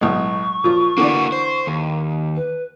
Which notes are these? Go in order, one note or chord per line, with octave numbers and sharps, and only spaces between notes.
B1 A2 G#3 C#6
A#2 F3 F4
D3 E3 A#3 F#4 D5
C5
D#2
B4